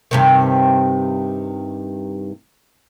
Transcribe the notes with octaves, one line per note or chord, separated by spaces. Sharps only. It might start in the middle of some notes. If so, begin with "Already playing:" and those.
G2 C3 D#3